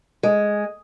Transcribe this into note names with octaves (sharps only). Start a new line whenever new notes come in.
G#3